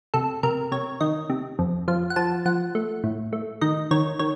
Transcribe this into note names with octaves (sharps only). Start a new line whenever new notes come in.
C3 A4
C3 A#4
C3 C#5
D#3 D#5
C3
F2
F3 F5
F#5
F3 A5
F3 F#5
A3
A2
A3
D#3 D#5
D#3 C#5
D#3 C#5